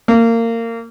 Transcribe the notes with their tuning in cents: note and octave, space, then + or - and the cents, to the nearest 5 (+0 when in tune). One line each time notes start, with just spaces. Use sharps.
A#3 -25